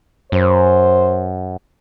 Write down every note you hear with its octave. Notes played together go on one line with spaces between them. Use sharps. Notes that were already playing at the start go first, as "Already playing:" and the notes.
F#2 C5